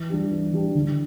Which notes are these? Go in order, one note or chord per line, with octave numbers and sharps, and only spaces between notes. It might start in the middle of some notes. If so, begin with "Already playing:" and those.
Already playing: E3
G3 D4 G4
E3
G3 D4 G4
D3